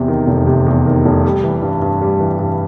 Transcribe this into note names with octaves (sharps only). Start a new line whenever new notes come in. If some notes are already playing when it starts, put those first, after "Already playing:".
Already playing: E2 C3
D#3
F1
C3
E2
D#3
F1
G3
E3
G2
G2
G3
E3
G2